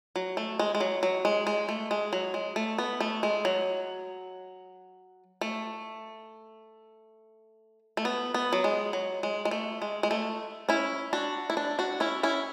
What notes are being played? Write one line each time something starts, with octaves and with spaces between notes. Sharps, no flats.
F#3
A3
G#3
G#3
F#3
F#3
G#3
G#3
A3
G#3
F#3
G#3
A3
B3
A3
G#3
F#3
A3
A3
B3
B3
F#3
G#3
F#3
G#3
G#3
A3
G#3
G#3
A3
C#4 E4
D4 F#4
E4
D4
D4 F#4
C#4 E4
C#4 E4